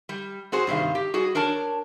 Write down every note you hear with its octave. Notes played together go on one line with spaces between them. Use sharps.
G3
C4 F#4 G#4 C5
G2 C3 D#3 F5
G4
G3 F#4 G#4
D4 A#4 C#5 A5